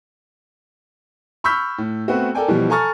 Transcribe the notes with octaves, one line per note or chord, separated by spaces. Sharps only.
B5 C#6 E6 F6 G6 B6
A2
A3 B3 C4 F#4
A4 A#4 D5 G5 G#5
B2 E3 F3 G3
A4 G#5 A#5 C#6 F6 A6